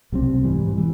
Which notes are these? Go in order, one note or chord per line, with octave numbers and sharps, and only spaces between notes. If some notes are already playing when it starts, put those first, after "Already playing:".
C2 B2 G3 C4
G#2 E3 G3
E3 G3